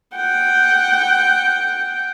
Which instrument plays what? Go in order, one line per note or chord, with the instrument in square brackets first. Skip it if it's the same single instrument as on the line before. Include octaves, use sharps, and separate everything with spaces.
[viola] F#5 G5